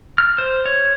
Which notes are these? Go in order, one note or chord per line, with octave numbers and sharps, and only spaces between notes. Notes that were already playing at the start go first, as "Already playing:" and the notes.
F6
C5
C#5